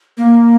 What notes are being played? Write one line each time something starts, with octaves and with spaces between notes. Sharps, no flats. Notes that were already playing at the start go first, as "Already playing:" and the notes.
A#3